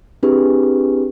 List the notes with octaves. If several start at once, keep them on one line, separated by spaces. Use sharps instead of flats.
C4 D4 E4 G4 G#4 B4